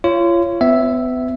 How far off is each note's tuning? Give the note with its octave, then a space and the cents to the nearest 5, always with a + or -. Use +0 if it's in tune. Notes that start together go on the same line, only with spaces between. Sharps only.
F4 -30 C#5 +0
B3 +35 E5 +0